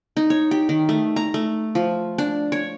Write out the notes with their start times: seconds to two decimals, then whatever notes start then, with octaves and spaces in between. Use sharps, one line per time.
0.17 D#4
0.30 C#5
0.51 G4
0.69 D#3
0.89 A3
1.16 A#5
1.34 A3
1.75 F3
2.18 D4
2.52 C#5